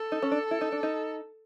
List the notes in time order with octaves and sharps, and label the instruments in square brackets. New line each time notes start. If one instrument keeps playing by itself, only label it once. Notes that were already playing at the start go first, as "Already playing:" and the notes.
Already playing: [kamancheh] A4
[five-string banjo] D#4
C#4
D4
E4
D#4
D4
D#4